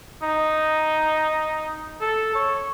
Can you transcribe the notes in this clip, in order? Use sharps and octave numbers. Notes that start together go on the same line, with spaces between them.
D#4
A4
C#5